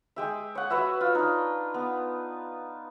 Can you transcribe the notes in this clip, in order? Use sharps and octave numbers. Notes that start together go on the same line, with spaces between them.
G#3 G4 E5
C#5 F#5
F#4 B4 C#5 E5
F4
D4 D#4
B3